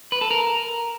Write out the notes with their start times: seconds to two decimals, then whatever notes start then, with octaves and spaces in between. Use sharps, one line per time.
0.12 B4
0.21 A4
0.31 A#4